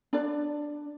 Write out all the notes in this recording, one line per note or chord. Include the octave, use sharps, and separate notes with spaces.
D4 D5